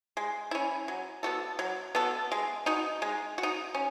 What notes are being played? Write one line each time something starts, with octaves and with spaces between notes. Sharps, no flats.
G#3
C#4 E4
F#3
B3 F#4 A4
F#3
B3 F#4 A4
G#3
D#4 F#4
G#3
F#4
D#4
C#4